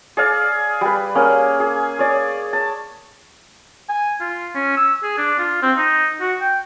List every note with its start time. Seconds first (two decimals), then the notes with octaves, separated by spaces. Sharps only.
0.17 G#4 D5 F5
0.81 G3 B4
1.15 A#3 C#4 G#4
1.60 G#4
1.99 C#5 D5
2.53 A5
3.89 G#5
4.21 F4
4.55 C#4
4.77 E6
5.03 G#4
5.18 D4
5.39 F4
5.62 C4
5.77 D#4
6.21 F#4
6.41 G5